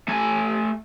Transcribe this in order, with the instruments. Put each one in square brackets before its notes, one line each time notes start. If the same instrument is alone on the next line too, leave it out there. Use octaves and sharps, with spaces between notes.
[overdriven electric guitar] A3 G#5